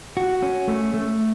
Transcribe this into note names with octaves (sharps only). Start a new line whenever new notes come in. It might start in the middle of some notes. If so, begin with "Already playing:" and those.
F#4
C#4
A3
A3